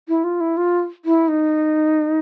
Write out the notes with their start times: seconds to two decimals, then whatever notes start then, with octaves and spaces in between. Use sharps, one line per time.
0.08 E4
0.24 F4
0.41 E4
0.57 F4
1.05 E4
1.28 D#4